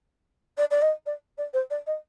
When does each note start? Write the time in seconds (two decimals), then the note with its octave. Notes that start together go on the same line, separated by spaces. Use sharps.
0.57 D5
0.70 D5
0.81 D#5
1.06 D5
1.37 D5
1.53 C5
1.70 D5
1.86 D#5